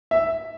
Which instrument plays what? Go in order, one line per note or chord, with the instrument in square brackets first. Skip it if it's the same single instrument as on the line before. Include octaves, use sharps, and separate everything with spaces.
[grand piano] E5